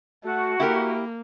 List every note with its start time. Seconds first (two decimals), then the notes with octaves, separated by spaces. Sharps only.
0.24 A3 F#4
0.60 A#3 E4 G4 A#4